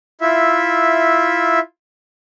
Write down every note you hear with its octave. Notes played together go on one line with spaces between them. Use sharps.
E4 F4 E5